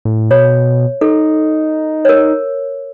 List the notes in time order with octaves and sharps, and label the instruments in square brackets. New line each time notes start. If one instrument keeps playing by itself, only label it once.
[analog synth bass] A2
[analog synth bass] B2 [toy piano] C#5
[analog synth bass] D#4 [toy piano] A4
[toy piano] A#4 C#5